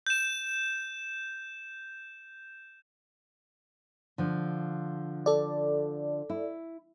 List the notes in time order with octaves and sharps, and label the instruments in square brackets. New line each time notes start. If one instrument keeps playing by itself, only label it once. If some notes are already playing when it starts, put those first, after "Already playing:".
[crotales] G6 E7
[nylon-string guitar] D3 F3
[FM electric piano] A4 D5
[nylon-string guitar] E4